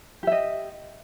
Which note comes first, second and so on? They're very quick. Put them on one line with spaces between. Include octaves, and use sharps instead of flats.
G4 E5 D#5